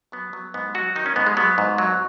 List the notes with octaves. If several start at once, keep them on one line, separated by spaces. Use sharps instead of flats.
F#3 B3
F#3
G#2 B3
F#3 F#4
D#3 D#4
C#4
G#2 B3
G#3
F#3 B3
G#2
F#3